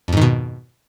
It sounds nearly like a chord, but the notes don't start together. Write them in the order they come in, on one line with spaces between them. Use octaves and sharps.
F2 G#2 D#3 B2